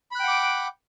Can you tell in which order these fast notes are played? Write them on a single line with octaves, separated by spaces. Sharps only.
B5 F#6 G5 F#5 D6